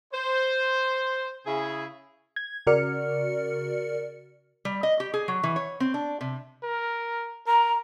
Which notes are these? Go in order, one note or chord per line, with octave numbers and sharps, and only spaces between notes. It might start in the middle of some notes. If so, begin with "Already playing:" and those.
C5
C#3 E4 G#4
G#6
C#3 F#4 A#4 D5 F6 C#7
G3
D#5
G4
G#4
F#3
E3
C#5
C4
D4
C3
A#4
A#4 A#5